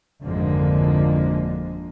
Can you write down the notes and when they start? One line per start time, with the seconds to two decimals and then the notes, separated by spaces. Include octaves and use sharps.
0.23 G#1 F2 D3 F3 G#3 A#3